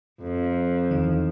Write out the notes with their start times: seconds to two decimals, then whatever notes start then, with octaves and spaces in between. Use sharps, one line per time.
0.21 F2
0.91 E2 D#3